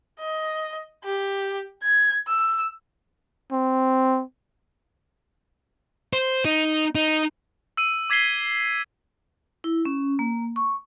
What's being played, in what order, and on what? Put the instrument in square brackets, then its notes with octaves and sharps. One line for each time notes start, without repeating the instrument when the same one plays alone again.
[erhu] D#5
G4
G#6
E6
[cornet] C4
[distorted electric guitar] C5
D#4
D#4
[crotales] E6 D#7
D6 G#6 B6 C7 G7
[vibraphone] E4
C#4
A#3
C#6